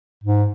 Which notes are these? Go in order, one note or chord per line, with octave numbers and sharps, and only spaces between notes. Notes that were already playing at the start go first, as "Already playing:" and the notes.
G#2